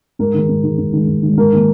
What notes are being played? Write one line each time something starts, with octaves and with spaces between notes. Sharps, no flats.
G#2 A#4
D#3 G#3
G#2
D#3 G#3
G#2
D#3 G#3
G#2
D#3
G#3
G#2 A#4
D#3 A#3